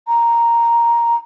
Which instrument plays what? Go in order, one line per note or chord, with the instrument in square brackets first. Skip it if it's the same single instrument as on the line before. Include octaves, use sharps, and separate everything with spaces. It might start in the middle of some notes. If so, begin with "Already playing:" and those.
[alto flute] A#5